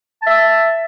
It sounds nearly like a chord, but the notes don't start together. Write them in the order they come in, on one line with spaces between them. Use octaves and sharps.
A5 E5 E6